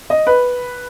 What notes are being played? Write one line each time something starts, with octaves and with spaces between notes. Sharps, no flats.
D#5
B4